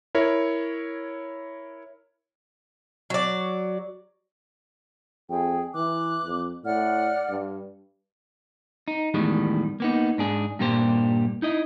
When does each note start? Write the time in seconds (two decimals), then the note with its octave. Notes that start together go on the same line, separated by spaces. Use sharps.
0.15 E4 A#4 C#5
3.10 F#3 D5
5.29 F2 G#4 G5
5.74 E3 D6 F#6
6.25 F2
6.65 A2 D5 F#5 F6
7.30 G2
8.88 D#4
9.14 E2 A2 D#3 G3 G#3
9.80 A#3 B3 D#4
10.18 G#2 D4 G#4
10.59 G2 A#2 G3 A#3 G4 C5
11.42 D#4 E4 D#5